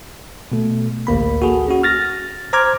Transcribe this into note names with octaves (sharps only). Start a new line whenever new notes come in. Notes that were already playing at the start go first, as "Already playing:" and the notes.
B2 A3
A1 D2 A#3 B5
F#4 G#4 A4
C#4 F#4
F6 A6 A#6
C5 A#5 D6 F6 G#6